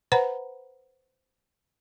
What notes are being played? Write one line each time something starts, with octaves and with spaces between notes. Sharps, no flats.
B4 C5 F#5 A#5 B5